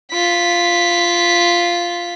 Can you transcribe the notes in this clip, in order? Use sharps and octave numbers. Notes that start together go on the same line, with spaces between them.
F4 B6